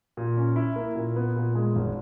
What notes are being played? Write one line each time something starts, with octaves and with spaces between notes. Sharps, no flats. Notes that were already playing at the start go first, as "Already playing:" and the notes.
A#2
C#4
E4
A#3
A#2
B3
A#2
G#3
G#1